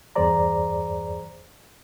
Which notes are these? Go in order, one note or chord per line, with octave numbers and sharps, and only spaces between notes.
E2 G2 G#4 C5 D5 A#5